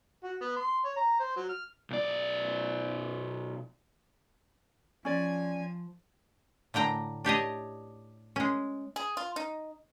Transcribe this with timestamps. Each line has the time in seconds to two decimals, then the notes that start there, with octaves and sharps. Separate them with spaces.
0.24 F#4
0.41 B3
0.56 C6
0.85 C#5
0.97 A#5
1.20 C5
1.36 F#3
1.49 F6
1.90 B1 D5
5.05 F3 C#4 D5 G#5
6.74 A2 D3 G5 A#5
7.25 D4 G4 C#5 D#5
8.36 G#3 C#4
8.96 G#4
9.17 F4
9.36 D#4